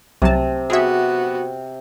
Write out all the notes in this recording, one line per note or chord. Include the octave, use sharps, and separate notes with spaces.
C2 C3 F#3 A5
B3 F#4 G#4 E5